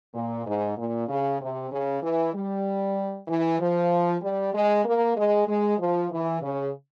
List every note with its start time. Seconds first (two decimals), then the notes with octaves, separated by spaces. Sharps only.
0.14 A#2
0.46 G#2
0.78 A#2
1.09 C#3
1.41 C3
1.72 C#3
2.03 E3
2.34 G3
3.28 E3
3.60 F3
4.22 G3
4.54 G#3
4.85 A#3
5.16 G#3
5.48 G#3
5.79 F3
6.11 E3
6.42 C#3